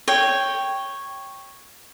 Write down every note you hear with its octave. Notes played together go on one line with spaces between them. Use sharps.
C#5 G5